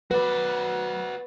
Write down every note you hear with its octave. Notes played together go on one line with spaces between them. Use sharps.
F#3 F#4 B4 D5